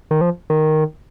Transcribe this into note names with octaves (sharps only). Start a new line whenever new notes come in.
D#3
F3
D#3